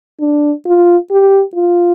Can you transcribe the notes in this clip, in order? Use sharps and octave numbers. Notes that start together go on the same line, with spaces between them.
D4
F4
G4
F4